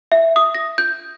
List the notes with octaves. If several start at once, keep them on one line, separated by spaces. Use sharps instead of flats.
E5
D#6
A#6
G6